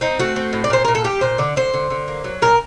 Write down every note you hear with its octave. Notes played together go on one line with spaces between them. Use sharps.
C4 D#4
A3 F#4
C4
A2
D5
A#2 C5
A#2 A#4
A4
G3 G4
A#2 C5
D3 D5
D3 C5
D3
D3
A#3
F#3
A#2 A#4